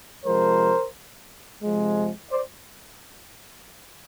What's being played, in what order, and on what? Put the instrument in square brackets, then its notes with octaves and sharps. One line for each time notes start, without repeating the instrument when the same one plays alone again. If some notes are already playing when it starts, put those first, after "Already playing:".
[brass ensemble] C3 F3 G#3 A#4 C5
C3 F3 G#3
C5 D5